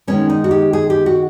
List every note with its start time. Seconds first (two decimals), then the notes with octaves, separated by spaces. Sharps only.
0.07 D#3 G#3 B3 C#4
0.30 D#4
0.44 F#4
0.51 G4
0.73 G#4
0.90 G4
1.06 F#4